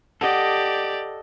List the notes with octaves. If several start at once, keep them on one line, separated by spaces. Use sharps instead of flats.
G4 A4 D5 D#5 F#5